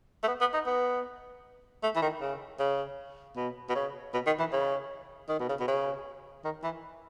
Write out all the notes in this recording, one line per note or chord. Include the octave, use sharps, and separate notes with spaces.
A3
B3
B3
D#4
B3
A3
E3
D#3
C#3
C#3
B2
B2
C#3
B2
D#3
E3
C#3
D#3
B2
C#3
B2
C#3
D#3
E3